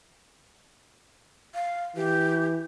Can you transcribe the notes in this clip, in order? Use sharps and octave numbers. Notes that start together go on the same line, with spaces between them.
F5
E3 G4